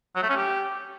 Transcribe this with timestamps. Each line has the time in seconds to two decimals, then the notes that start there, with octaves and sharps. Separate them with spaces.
0.15 F#3
0.22 A3
0.29 C#4
0.36 G4